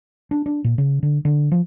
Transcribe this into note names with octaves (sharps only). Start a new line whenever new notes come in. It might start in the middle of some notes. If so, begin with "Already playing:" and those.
D4
D4
A#2
C#3
D3
D3
F3